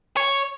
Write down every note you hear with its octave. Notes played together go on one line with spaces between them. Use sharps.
C#5